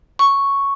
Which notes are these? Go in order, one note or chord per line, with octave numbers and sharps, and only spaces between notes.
C#6